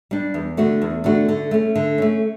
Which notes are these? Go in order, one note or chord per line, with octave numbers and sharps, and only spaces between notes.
G3 D4
E2
D3 A3 D4 F#4
E2
D3 A3 D4 F#4
D3
A3 C#4
D3
A3 C#4